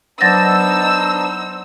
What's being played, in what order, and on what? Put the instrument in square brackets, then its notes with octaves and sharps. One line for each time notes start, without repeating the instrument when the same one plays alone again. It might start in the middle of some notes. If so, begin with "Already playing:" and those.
[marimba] F#3 A6 A#6 [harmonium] B3 D4 C5 [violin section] D#4 E6